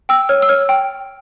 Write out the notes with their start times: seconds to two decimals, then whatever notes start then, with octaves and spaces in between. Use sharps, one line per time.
0.09 G5 E6
0.29 C#5 F6
0.42 E6
0.49 C#5 F6
0.69 G5